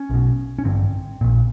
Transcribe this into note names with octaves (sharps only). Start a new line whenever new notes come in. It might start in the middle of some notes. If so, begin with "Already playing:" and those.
Already playing: C#4
B1 B2
C#4
A1 G2 D3 C4
A#1 A#2